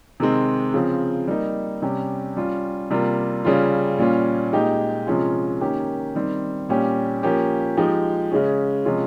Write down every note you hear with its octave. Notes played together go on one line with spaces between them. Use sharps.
C3 D#3 G#3 C4
C#3 F3 C4
G3 A#3 D#4
C3 G3 C#4 G4
G3 C#4 F4
C3 G3 A#3 F4
C#3 G3 C#4 F4
A#2 G3 C#4 F4
A#2 G#3 D#4 G4
C3 F3 G#3 C#4 F4
D#3 A#3 C#4 G4
D#3 G3 C4
A#2 G3 C#4 G4
F3 A#3 C#4 G4
F3 G#3 D#4 G4
C#3 G#3 C#4
C3 F3 G#3 C#4 F4